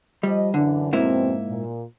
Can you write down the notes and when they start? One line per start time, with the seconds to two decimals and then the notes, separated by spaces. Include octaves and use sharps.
0.23 F3 G3 D#5
0.54 F#2 D3 E3 D4
0.93 F2 G#2 B2 A#3 C4 E4
1.48 A#2